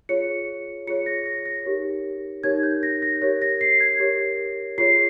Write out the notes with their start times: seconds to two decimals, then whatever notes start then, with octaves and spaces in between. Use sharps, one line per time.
0.09 F4 G#4 C#5 C#7
0.87 F4 G#4 C#5 C#7
1.06 A#6
1.26 A#6
1.46 A#6
1.65 D#4 G4 A#4 C#5
2.43 D#4 G4 A#4 C#5 G#6
2.63 G6
2.83 A#6
3.02 A#6
3.22 G4 A#4 C#5 A#6
3.42 A#6
3.61 C7
3.80 G#6
4.00 G4 A#4 C#5
4.78 F4 G#4 C#5 C7